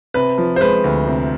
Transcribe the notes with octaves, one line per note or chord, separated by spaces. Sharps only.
C3 B4
F3
C5
G#3 B4
D2
C3